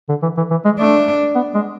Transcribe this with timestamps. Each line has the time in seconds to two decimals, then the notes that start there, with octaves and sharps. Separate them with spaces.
0.09 D3
0.22 E3
0.37 E3
0.51 E3
0.65 G#3
0.79 A3 D4
1.35 B3
1.55 G#3